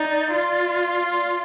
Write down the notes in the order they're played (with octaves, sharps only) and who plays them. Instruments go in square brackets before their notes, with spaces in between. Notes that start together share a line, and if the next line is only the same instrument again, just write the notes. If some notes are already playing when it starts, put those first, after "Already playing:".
Already playing: [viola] D#4 [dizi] D5
[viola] F4
[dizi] D5